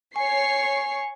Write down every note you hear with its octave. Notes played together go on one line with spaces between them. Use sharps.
C#5 G#5 C#6 C7